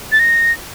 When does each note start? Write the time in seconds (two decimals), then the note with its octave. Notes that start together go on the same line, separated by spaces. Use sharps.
0.12 A6
0.20 A#6